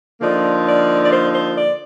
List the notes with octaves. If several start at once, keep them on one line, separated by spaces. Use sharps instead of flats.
D3 F3 A#3 D#4 D5
D5
D5
C5
C5
D5